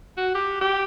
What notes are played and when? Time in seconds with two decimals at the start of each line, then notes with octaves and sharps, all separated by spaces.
0.17 F#4
0.35 G4
0.61 G4